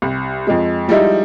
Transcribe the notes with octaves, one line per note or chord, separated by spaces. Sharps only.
C2
F2 G#3
F3 G3 G#3 D#4 E4